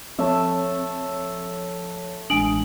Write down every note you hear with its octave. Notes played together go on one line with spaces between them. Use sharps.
F3 A3 C4 C#5 E5
A1 G#3 D4 G#5 D#6 D7 F#7